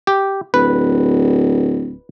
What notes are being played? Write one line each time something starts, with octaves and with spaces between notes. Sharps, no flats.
G4
D1 B4